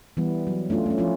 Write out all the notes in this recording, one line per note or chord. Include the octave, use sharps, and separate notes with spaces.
E3 G3 B3
F#3
A3 C#4 D4 F4
A3 C#4
F3 C#4 E4 F4